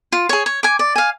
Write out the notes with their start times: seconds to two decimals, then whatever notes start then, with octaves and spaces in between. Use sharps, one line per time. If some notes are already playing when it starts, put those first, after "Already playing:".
0.12 F4
0.29 G#4 C#5
0.46 C#5
0.63 G#5 D6
0.79 D5
0.96 F5 G#5